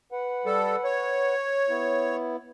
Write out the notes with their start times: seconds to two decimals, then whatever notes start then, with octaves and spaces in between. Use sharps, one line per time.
0.12 B4 F#5
0.45 G3 A4
0.84 C#5
1.69 B3 E4